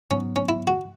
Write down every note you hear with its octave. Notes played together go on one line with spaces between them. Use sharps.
G#2 F#3 B3 C#4
C#4
E4
F#4